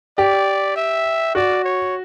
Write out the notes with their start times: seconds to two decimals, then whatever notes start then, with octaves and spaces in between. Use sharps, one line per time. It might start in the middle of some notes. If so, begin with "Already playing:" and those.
0.18 G4 D5
0.76 E5
1.35 F#4 D5
1.64 C#5